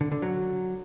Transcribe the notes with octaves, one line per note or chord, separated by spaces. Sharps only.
D3
D3
F#3